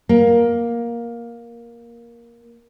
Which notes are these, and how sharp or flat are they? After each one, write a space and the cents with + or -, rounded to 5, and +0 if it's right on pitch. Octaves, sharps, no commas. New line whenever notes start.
A#3 +10